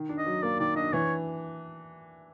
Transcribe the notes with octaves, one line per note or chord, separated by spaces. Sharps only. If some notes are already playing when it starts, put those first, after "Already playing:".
Already playing: D#3
D4
D#5
F#3
A#3 D5
D#3 D5
D4 D#5
E3 C#5